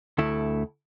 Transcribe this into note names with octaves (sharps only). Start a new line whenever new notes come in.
D2 A3 E4